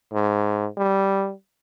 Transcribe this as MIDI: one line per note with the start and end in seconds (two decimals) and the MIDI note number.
0.13 0.67 44
0.77 1.32 55